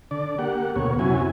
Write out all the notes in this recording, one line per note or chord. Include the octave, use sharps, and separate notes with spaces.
D3 D5
A#3 G4 F#5
D2 B2 A#3 C#5
F#2 C3 C#4 E4 F#4 G#5